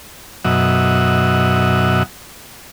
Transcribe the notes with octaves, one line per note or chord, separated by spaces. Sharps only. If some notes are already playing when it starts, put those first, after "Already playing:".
F#2 B2 F#3 D#5 E5 F#5